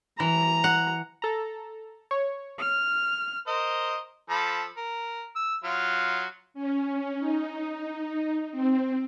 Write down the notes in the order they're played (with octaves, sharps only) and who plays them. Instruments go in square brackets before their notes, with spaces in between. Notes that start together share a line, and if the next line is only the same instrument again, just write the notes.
[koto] E3 [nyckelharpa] A#5
[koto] F#5
[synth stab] A4 A#5
C#5
[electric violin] F6
[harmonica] A#4 C5 D#5
F3 A4 B5
A#4
E6
F#3 F4 F6
[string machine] C#4
D#4
C4